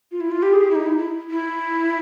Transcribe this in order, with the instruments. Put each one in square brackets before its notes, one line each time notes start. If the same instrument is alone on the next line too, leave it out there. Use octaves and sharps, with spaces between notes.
[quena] F4
E4
F4
G4
G#4
G4
E4
D#4
E4
E4
E4